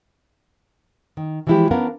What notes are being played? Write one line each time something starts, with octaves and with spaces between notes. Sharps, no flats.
D#3
E3 F3 G#3 E4 F4 G4
B3 C#4 D4 A#4 C#5 F5